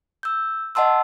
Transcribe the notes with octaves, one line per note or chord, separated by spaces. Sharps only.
E6 G6
D#5 F#5 A5 C6 E6